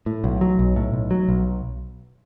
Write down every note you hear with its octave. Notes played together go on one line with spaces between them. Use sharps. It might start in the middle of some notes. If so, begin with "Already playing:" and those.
A2
B1
F#3
B1
A2
B1
F#3
B1